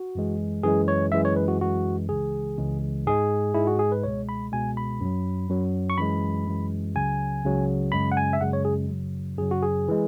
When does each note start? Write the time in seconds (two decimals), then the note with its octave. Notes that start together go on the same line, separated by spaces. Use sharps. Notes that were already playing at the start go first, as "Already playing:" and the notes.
Already playing: F#4
0.15 F#2 E3 G#3
0.63 F#2 E3 G#3 G#4
0.88 C#5
1.12 F#2 E3 G#3 E5
1.25 C#5
1.36 B4
1.48 F#4
1.60 F#2 E3 G#3 F#4
2.09 C#2 C#3 E3 G#3 G#4
2.58 C#2 C#3 E3 G#3
3.07 G#2 G#3 G#4
3.54 G#2 G#3 E4
3.67 F#4
3.79 G#4
3.92 B4
4.03 C#2 B2 G#3 C#5
4.29 B5
4.52 C#2 B2 G#3 G#5
4.77 B5
5.01 F#2 F#3
5.49 F#2 F#3
5.90 C#6
5.98 F#2 E3 G#3 B5
6.47 F#2 E3 G#3
6.95 C#2 C#3 F#3 G#5
7.44 C#2 C#3 F#3
7.92 F#2 C#3 G#3 B5
8.12 F#5
8.17 G#5
8.33 E5
8.40 F#2 C#3 G#3 F#5
8.53 C#5
8.65 G#4
8.89 F#2 C#3 F#3
9.38 F#2 C#3 F#3 G#4
9.51 F#4
9.62 G#4
9.88 E3 G#3